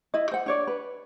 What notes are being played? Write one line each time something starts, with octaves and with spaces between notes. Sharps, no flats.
E4 D#5
C5 F#5
D4 C#5 D5
B4